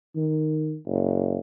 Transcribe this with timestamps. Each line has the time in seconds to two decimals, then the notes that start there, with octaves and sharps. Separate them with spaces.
0.16 D#3
0.86 F#1